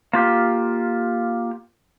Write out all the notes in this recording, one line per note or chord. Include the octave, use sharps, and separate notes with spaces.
A#3 F4 G4